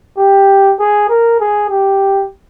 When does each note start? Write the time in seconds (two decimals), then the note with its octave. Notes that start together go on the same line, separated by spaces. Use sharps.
0.18 G4
0.79 G#4
1.09 A#4
1.40 G#4
1.70 G4